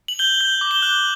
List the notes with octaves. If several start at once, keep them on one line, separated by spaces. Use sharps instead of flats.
F#7
G6 G7
G6
D6
G7
F#6 F#7